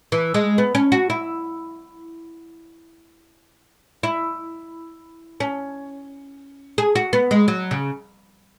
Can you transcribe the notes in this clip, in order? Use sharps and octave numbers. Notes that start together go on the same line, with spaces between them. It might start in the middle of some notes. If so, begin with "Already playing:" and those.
E3
G#3
B3
C#4
F#4
E4
E4
C#4
G#4
F#4
B3
G#3
F#3
C#3